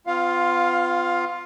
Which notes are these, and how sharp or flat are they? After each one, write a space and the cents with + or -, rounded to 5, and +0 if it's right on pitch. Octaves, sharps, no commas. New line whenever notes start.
B3 +45 F4 +0 F5 +15